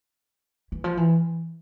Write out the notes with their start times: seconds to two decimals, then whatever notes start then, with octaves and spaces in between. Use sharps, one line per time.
0.72 E3
0.84 F3
0.97 E3